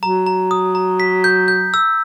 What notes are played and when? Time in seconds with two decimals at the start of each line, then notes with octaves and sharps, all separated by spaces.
0.02 F#3 A#5
0.26 A#5
0.51 D#6
0.75 A#5
1.00 B6
1.24 G6
1.48 G6
1.74 E6